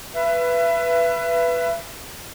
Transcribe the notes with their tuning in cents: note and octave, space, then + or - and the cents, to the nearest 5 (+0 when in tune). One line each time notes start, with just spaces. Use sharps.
B4 +0 E5 +35